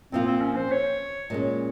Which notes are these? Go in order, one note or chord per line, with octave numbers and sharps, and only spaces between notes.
A#2 F3 A#3 C4 F4
C4
C#4
C5
C#5
A#2 G#3 C#4